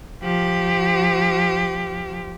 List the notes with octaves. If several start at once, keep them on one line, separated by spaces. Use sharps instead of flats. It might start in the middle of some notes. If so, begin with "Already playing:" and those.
F3 G4